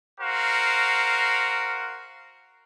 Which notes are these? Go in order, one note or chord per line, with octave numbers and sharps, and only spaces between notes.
F#4 A#4 C5 F5